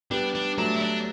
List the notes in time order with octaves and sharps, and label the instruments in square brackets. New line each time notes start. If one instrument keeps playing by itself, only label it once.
[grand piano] G3 B3 [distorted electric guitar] D4
[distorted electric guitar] D4
[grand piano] F#3 A3 [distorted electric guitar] D4
[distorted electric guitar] E4
D4